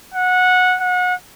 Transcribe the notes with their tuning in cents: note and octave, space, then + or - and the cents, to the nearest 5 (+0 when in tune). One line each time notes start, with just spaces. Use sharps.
F#5 -15
F#5 -30